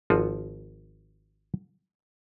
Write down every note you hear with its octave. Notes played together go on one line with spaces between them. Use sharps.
G#1 F3 F4 F#4